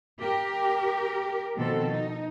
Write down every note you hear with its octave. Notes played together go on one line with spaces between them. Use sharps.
G4 A#4
B2 D#3 F3 C4 A4
D#4